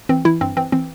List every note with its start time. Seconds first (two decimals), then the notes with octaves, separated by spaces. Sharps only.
0.09 E3 C4
0.25 E3 E4
0.41 G2 C4
0.57 E3 C4
0.72 E3 C4